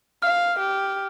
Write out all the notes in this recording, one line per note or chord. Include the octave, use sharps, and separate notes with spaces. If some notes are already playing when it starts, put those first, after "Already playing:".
F5 F6
G4